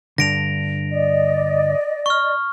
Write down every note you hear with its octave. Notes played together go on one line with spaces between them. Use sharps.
G2 D3 A#6 D7 F7
D5 D#5
C#6 F6